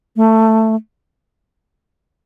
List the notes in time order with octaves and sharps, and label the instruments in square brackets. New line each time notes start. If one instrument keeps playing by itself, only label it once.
[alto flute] A3